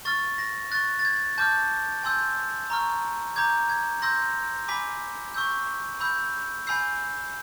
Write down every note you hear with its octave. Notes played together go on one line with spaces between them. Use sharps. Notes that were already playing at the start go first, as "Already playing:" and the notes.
C#6 F6 A6
A#6
C#6 F#6 A6
A6
G#6
A5 D6 F6 G6
G#5 C6 E6 G6
A#5 C#6 F6
A#5 D6 G6 G#6
G#6
C6 E6 G6 A#6
G#5 B5 D6 B6
C#6 E6 G6
B5 E6 G6
G#5 B5 E6 G6 C7